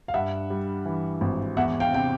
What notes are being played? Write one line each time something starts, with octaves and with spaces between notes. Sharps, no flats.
F5
G2 E5 F#5
G3
E3
G#1
E2 E5 F#5
F5 G5
C3 G5